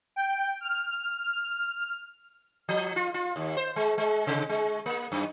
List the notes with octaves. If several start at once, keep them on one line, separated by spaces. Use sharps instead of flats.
G5
F6
F3
F4
F4
D#2
C5
G#3
G#3
C3
G#3
A#3
F#2